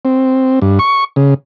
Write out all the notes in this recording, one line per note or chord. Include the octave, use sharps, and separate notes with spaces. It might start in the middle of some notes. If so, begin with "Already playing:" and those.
C4
G2
C#6
C#3